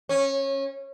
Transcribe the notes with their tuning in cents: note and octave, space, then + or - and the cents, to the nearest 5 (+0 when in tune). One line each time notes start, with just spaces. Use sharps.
C#4 -20